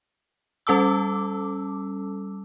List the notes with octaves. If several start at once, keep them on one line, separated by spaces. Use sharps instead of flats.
G3 C#4 A4 A5 D6 E6